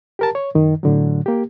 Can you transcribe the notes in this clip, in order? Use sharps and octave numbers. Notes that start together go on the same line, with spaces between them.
G4 A#4 A5
C#5
F#2 D#3
A2 D3 F#3
A#3 G4